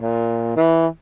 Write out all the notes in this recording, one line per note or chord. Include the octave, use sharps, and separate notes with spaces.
A#2
E3